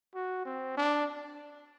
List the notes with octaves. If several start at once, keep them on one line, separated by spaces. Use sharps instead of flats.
F#4
C4
D4